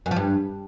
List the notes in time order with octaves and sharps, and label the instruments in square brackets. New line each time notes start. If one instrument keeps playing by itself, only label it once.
[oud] F#2
F3
G2